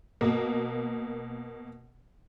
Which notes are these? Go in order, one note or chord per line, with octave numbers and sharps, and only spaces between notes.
B2 A#3